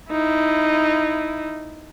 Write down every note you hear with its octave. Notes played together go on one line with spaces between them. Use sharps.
D#4 E4